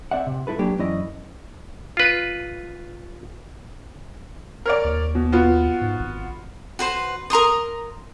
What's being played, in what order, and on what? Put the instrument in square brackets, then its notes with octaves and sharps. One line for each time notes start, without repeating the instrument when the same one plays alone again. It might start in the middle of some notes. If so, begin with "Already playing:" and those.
[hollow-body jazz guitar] C4 D5 E5 F#5
C3
G#3 E4 A4 B4
F#3 G#3 A#3 D4 G4
F#2 E3 C#4 E4 D5 D#5
[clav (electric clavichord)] F4 B4
[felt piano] A#4 C#5 D5
[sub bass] D#2
[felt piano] B2
B3 F4 F#4
[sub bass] G#2
G#1
[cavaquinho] F#4 B4 C5
A#4 A#5 C6 D#6